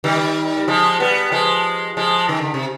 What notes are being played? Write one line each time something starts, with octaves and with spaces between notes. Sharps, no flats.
D#3 G3
G3
F3 G#3
G3 B3
F3 G#3
F3 G#3
D#3
D3
C3